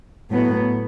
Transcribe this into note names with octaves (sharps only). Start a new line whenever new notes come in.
A2 F#3 B3